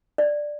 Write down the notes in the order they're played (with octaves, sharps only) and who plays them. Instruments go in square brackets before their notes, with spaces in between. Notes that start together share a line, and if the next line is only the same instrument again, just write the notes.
[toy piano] D5